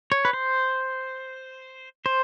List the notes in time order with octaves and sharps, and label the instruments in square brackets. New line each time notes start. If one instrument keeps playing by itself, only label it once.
[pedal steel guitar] C#5
B4
C5
C5